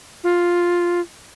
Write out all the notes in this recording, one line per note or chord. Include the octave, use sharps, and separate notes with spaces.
F4